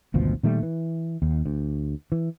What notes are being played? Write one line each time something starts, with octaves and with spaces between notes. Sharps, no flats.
G#1 D2 B2 F3
A#2 D#3 G3 A3
E3
D#2
D2
E3